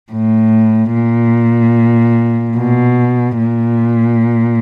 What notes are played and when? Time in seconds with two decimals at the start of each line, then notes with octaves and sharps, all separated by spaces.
0.12 A2
0.94 A#2
2.57 B2
3.39 A#2